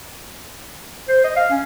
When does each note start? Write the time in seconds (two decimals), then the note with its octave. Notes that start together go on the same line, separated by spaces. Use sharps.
1.08 C5
1.24 D#5
1.36 F5
1.51 C#4